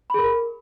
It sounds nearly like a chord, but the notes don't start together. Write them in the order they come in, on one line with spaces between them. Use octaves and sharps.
B5 G#4 A#4